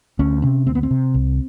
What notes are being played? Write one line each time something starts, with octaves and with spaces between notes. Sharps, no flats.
D2 C#4
C3 C#4
D2 C4
B3
C4
C3
C2